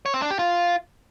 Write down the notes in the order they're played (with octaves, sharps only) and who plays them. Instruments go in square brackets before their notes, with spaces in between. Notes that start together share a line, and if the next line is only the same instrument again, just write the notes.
[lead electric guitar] C#5
C4
D4
G4
F4